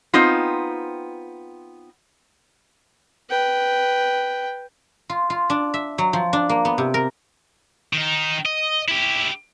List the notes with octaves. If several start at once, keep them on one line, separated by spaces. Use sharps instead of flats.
B3 C4 D#4 F4
B4 G5
F4
F4
D4
E5
F#3
F3
D4
A#3
B3
C3
A#4
D#3 D#4
D#5
E4 G4